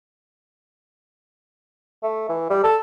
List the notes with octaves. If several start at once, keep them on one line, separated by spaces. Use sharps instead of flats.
A3
E3
G3
A4